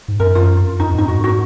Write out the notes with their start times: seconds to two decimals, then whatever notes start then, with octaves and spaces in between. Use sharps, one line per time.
0.08 G#2
0.20 F#2 A#4
0.35 F4
0.79 F2 D#4
0.94 G#2 D#4
1.08 G#2 F#4
1.24 F#4